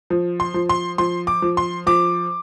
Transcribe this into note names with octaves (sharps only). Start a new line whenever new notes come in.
F3
C6
F3
C6
F3 C6
D6
F3
C6
F3 D6